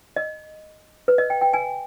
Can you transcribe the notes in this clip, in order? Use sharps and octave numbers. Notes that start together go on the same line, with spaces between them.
D#5
B4
D#5
G5
G5
G#5